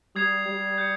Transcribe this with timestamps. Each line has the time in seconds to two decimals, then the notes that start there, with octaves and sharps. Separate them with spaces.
0.15 G3 D#6 G#6 C7 F7
0.47 G3
0.78 G6 C#7